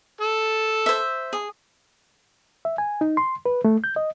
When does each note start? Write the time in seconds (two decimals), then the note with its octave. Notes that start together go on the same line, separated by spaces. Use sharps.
0.21 A4
0.86 C5 E5
1.33 G#4
2.65 E5
2.78 G#5
3.01 D#4
3.17 C6
3.46 B4
3.65 A3
3.84 G6
3.96 D#5